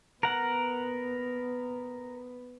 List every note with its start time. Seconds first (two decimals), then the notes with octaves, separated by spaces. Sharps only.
0.23 B3 A#4 F#5